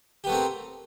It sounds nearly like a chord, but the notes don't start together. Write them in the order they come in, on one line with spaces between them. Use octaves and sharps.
G4 B3 A3 C4 A#4